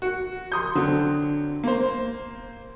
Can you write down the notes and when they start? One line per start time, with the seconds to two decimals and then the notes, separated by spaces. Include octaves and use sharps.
0.02 F#4
0.52 C6 D#6 G6
0.75 D3 F#3 C4
1.64 A#3 C5